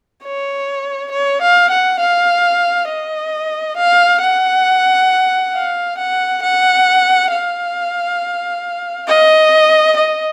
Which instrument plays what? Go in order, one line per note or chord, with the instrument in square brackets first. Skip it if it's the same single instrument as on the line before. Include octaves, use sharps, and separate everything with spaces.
[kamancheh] C#5
C#5
F5
F#5
F5
D#5
F5
F#5
F5
F#5
F#5
F5
D#5
D#5